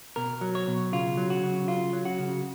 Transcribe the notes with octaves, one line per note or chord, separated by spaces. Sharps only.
B2 A#4
F#3
C#5
B2
C#3 F4
F#3
F#4
C#3
C#3 F4
F#3
F#4
C#3